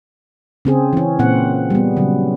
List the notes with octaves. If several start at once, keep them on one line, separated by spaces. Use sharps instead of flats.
C#3 C4 G#4
E3 C#4
A#2 C4 F#5
G3 B3
C#3 F#3